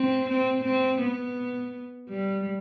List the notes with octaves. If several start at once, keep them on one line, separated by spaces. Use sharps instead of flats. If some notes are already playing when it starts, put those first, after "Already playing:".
Already playing: C4
C4
C4
B3
G3